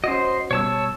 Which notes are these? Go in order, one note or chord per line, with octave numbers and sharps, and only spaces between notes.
C#4 F#4 C5 D#5
B2 G3 C#5 A5 E6